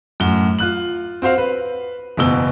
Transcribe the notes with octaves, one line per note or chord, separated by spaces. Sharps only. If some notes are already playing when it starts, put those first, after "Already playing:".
F#2 A2 G7
F4 F#6 F#7
C4 F#4 C5 F5
B4
F#1 E2 B2 E6 G7